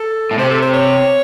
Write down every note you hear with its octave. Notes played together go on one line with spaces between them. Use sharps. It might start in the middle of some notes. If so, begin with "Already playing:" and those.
Already playing: A4
A2
C3 C5
A4
C5
C#5